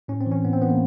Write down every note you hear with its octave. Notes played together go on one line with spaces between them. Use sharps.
A2 C#4
C4
E3
C#4
A2 B3
C4
E3 B3
A#3